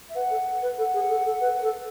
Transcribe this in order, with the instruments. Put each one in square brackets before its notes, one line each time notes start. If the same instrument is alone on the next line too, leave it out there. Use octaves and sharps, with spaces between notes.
[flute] E5
[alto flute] B4 [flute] F#5
[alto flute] A4
B4
[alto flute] A4 [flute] F#5
[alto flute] G#4
A4
A4
B4
B4
A4